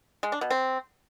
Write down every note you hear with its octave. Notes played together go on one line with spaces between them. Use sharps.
G#3
D4
B2
C4